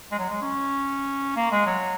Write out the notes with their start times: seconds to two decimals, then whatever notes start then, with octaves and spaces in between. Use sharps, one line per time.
0.11 G#3
0.18 F#3
0.29 G#3
0.41 C#4
1.36 A#3
1.51 G#3
1.66 F#3